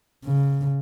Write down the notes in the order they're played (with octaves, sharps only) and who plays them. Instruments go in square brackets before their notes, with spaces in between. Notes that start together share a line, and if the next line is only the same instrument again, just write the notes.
[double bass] C#3